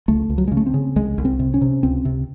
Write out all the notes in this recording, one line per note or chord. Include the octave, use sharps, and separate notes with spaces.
C#2 A3
C#2
F#3
G#3
C#3
A3
C4
C#3
C2 G#3
C2
C4
C3
C#4
C3
C#2 C4
C3